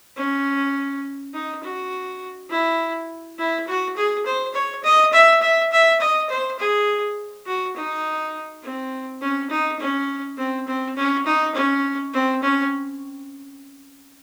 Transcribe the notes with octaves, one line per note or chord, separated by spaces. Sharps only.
C#4
D#4
F#4
E4
E4
F#4
G#4
C5
C#5
D#5
E5
E5
E5
D#5
C5
G#4
F#4
D#4
C4
C#4
D#4
C#4
C4
C4
C#4
D#4
C#4
C4
C#4